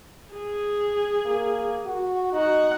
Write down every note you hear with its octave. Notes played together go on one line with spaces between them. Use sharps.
G#4
A#3
F#4
D#4 F#4 F#5